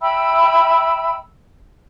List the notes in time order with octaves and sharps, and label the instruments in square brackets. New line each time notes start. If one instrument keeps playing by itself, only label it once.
[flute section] E5 G5 B5 E6